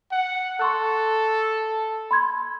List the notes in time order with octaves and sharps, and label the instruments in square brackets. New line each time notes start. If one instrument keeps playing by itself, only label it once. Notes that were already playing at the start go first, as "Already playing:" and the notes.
[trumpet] F#5
[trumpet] A4 [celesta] C6 C#6 F#6
[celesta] B5 C6 G#6